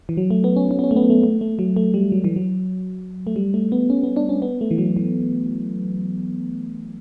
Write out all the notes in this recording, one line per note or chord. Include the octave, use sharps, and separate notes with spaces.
E3
F#3
A3
B3
C#4
C#4
B3
C#4
A3
B3
A3
A3
A3
F#3
A3
G3
F#3
E3
F#3
A3
G3
A3
B3
C#4
B3
D4
C#4
B3
A3
E3
F#3
E3